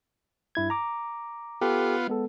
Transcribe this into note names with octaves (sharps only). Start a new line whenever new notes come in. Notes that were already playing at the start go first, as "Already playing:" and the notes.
G2 E4 G#6
A#5 D6
B3 F4 G4 A4
G#3 B3 A4